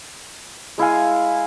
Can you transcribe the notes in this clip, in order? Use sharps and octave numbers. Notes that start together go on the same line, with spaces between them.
G#3 E4 F5 G#5